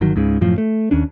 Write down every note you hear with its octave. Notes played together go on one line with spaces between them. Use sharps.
G1 D#3 F#3
C#2 G#2 C#3
F#2 A2 F3
A3
D#2 C#4 D4